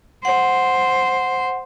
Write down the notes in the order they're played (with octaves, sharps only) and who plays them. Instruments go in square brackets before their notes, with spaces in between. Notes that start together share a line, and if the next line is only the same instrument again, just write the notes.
[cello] C5 [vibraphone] F#5